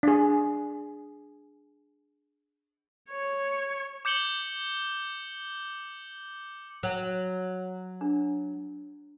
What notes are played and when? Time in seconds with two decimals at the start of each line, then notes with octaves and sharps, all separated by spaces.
0.03 D4 G#4
3.10 C#5
4.05 D6 G6 C#7 F#7 G7
6.83 F#3
8.01 D4